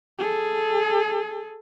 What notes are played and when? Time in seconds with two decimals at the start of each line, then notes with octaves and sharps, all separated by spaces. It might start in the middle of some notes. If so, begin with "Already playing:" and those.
0.19 G#4 A4